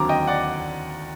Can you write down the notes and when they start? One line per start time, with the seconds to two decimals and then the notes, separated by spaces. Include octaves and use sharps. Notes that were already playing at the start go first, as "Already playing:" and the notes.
Already playing: D#2 D3 F#3 C4 A#5 D6
0.09 D#5 G5
0.27 D5 F#5